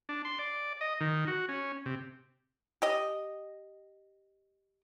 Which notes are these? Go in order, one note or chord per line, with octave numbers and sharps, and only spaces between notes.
D4
C6
D5
D#5
D#3
F#4
C#4
C3
G4 D#5